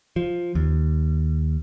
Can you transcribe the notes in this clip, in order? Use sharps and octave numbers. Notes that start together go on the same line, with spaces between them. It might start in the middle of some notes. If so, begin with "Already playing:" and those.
F3
D#2